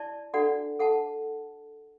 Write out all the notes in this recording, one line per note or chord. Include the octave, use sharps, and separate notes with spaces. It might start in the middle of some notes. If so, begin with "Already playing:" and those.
Already playing: E4 D5 A5
D4 F#4 A4 D5 F#5
A4 F#5 A5